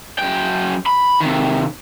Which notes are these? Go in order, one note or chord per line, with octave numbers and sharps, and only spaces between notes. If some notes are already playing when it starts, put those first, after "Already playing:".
F#2 G5
B5
C3 D#3